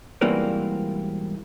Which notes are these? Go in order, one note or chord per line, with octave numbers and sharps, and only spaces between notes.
G#2 B2 E3 G3 A#3 C4